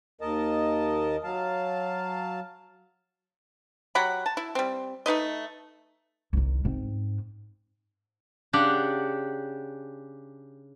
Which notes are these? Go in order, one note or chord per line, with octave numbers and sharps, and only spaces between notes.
D#2 A#4 D#5 A5
F#3 F5 A5
F#3 G4 F#5 B5
A5
E4
G3 C4
A3 D#4 B4 D#5
C2 D#3
G#2 C4
C#3 D4 G4 F#5